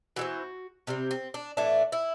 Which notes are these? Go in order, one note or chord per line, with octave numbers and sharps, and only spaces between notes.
E3 G3 C4 F#4
C3 G3 C4
C4
D4
A2 E3 A3 D4
E4